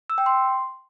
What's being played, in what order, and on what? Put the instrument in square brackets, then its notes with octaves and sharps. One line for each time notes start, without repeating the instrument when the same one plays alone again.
[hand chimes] E6
G5
C6